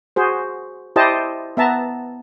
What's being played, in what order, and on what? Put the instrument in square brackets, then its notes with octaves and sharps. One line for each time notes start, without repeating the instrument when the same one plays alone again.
[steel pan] F#4 G#4 C5
E4 G4 C5 D5 D#5 A5
B3 E5 A5 A#5